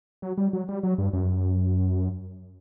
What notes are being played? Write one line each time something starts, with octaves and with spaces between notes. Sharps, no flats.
F#3
G3
F#3
G3
F#3
G2
F#2